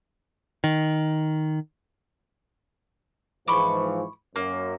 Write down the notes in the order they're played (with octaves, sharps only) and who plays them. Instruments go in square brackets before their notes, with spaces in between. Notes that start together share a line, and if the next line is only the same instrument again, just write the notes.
[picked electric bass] D#3
[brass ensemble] G#2 E3 F3 [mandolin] B5 C#6 D6
[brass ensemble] F#2 [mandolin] A#3